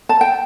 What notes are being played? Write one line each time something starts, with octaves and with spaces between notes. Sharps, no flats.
A5
G5